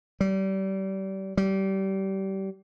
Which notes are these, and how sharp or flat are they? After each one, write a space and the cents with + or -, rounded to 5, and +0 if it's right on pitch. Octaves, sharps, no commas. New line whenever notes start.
G3 -30
G3 -25